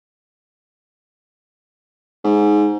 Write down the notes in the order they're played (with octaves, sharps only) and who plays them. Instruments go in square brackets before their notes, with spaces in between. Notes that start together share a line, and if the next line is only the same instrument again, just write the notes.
[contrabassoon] G#2